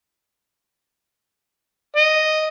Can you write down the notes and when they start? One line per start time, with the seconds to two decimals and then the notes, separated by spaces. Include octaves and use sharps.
1.96 D#5